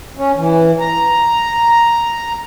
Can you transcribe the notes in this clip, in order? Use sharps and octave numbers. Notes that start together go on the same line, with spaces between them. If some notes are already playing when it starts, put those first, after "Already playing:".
C#4
E3
A#5